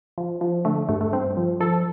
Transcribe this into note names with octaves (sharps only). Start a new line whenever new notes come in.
F3
F3
D3 A3
G2 A3
A3
G2 C4
F3
F3 A4